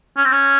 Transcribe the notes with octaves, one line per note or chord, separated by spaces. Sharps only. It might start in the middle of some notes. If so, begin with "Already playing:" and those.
C#4
C4
C#4